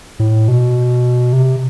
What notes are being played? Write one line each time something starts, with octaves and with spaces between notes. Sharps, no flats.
A2
B2
C3